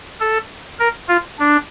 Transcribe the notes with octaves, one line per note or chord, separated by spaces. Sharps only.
A4
A#4
F4
D4